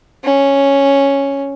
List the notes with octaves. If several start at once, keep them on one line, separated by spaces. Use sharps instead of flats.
C#4